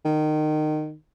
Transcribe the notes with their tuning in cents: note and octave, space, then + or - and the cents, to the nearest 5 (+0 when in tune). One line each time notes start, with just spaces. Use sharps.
D#3 -25